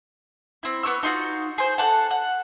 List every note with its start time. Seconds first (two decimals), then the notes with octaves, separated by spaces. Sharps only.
0.63 C4 E4
0.83 B3 G4 C#6 E6
1.03 D#4 F4 F#4
1.58 G#4 C5
1.78 A4 F#5 A5
2.11 F#5